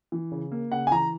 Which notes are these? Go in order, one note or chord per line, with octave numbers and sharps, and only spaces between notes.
E3
C#3
A#3
C#3 F#5
G#5
E3 A#5